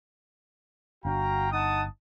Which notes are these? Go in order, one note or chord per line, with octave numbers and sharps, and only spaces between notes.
G1 D4 F#4 F5 G5 A#5
D#4 F#5 A5 D#6